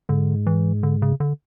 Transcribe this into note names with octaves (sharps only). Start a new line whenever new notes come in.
G#2 D3
E3
D3
C#3
D3